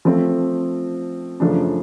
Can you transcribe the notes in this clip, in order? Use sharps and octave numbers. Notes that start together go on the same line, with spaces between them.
F3 A3 C4
F#2 C#3 F3 A3 D4